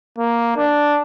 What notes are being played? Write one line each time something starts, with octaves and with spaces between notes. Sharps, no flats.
A#3
D4